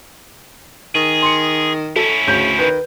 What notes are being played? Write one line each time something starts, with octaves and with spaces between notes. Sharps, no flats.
D#3 G#4
C6 C#7
C#4 E4 A4
D2 C#3 G6
D#3 B4